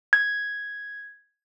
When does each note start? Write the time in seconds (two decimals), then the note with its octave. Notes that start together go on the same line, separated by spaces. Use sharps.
0.13 G#6